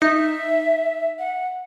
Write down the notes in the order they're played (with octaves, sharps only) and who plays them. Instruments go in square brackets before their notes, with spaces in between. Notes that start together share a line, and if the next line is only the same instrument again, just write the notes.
[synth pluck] D#4 [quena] E5
[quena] F#5